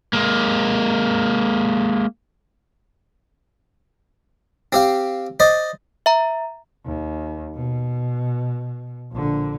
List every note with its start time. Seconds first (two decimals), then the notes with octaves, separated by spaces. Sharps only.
0.13 G#3 A#3
4.72 C4 G4 F5
5.40 C5 D5 D#5
6.06 E5 A#5
6.85 D#2
7.55 B2
9.12 A#1 D3